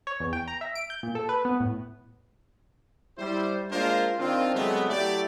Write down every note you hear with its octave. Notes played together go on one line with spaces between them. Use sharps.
C#5
E2
G5
A#5
E5
D7
G6
A#2
A4
B4
B3
A2
G3 E4 C5
G#3 A#3 D4 F4 A#4 C5
D#3 C4 D4 F4
C3 F#3 G#3 A3 B3
F#3 A3 E4 G4 D5